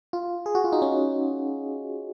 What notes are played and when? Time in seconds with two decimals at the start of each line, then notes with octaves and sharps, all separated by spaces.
0.13 F4
0.46 G#4
0.55 F#4
0.64 F4
0.72 D#4
0.82 C#4